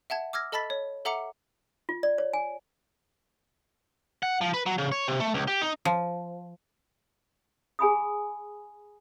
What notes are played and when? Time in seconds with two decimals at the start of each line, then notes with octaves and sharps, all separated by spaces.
0.10 E5 F#5 A5 G#6
0.33 D6 E6 F6 G#6 A#6
0.52 A4 D#5 A5 B5 A6 B6
0.70 C#5
1.05 A4 E5 F#5 A#5 D6 C#7
1.89 F4
2.03 D5
2.18 C#5
2.33 G#5
4.23 F#5
4.41 F3
4.54 B4
4.66 F#3
4.78 C#3
4.92 C#5
5.08 C3
5.20 A3
5.34 C#2
5.48 G4
5.61 D#4
5.85 F3
7.79 G#4 G#5 B5 D#6